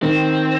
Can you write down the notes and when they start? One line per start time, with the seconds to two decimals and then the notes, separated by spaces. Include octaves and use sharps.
0.03 D#3 C4